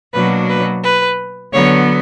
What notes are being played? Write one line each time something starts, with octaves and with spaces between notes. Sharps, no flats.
B2 F#3 A#3 D4 B4
B4
B4
D3 F#3 B3 C#5